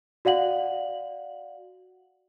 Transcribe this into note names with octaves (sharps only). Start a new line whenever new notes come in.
F#4 D5 F5 F#5 F#7